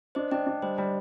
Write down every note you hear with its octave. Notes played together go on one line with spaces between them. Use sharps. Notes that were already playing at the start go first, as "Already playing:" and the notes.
D4 C5 D#5
D4 D#5 G5
D4
G3 C5 D#5
G3 C5 D#5